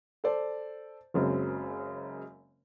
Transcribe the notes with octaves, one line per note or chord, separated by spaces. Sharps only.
A4 C5 D5
F#1 F#2 C#3 G#3 C4